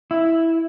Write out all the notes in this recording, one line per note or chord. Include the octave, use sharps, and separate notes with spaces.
E4